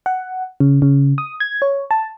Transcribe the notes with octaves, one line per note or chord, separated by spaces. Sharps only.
F#5
C#3
C#3
D#6
G#6
C#5
A5